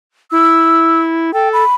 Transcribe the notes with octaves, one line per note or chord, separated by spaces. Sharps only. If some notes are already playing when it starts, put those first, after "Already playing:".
E4 E6
A4 G5
B5